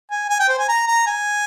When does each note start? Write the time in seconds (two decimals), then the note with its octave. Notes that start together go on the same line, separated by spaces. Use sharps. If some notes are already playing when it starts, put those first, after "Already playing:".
0.11 G#5
0.30 G#5
0.40 G5
0.49 C5
0.58 G#5
0.69 A#5
0.87 A#5
1.07 G#5